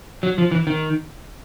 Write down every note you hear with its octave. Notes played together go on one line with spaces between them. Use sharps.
F#3
F3
E3
D#3